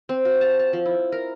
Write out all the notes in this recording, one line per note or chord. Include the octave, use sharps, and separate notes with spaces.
C4
F#4
A5
A5
F3
E4
A#4